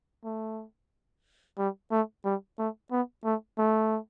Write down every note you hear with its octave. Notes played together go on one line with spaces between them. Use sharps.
A3
G3
A3
G3
A3
B3
A3
A3